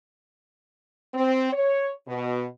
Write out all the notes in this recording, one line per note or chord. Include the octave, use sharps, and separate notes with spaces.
C4
C#5
B2